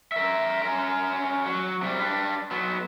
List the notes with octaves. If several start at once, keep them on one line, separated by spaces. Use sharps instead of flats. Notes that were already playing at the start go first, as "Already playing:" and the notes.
A#4 E5
C#4 A#4
F#3
C3 G3
G3 D4
F#3 B3